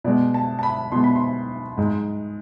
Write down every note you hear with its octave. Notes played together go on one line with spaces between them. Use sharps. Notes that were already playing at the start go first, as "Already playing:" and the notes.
B2 G#3 D5
A5
A5
B5
B2 G#3 C6
B5
C6
G#2 G#3